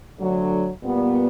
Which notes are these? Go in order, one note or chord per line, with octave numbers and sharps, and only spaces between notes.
D2 D3 F#3
A#2 G3 B3